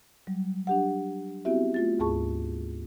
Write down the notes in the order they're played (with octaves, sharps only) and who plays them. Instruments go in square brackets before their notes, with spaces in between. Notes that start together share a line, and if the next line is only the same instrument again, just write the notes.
[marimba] F#3 G3
D4 G4 F#5
B3 C4 E4 F#4 G4 E5
A3 F4 A6
D2 G#2 G#4 A5 C#6